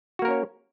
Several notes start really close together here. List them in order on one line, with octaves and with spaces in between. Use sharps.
F#4 A#3 A#4 C#4 C#5